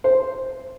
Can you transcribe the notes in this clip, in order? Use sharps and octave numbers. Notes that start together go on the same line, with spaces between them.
C5